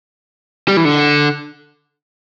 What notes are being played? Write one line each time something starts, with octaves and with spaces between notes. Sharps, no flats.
G3
E3
D3